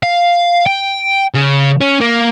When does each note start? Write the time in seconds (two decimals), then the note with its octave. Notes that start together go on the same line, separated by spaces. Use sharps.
0.03 F5
0.66 G5
1.34 C#3
1.81 C#4
2.01 A#3